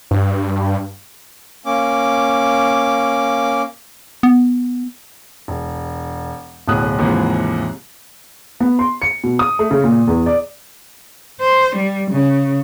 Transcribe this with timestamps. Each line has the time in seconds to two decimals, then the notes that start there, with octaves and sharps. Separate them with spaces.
0.11 G2
1.66 A#3 C#4 D6
4.23 B3
5.48 E1
6.68 D1 B1 A2 D#6 F#6
6.99 D#2 G#2 C3 E3 F3 G#3
8.60 B3
8.79 C6
9.02 C#7
9.24 B2
9.39 D#6
9.59 A3
9.71 C#3
9.84 A#2
10.07 E2
10.26 D5
11.41 C5
11.76 G3
12.11 C#3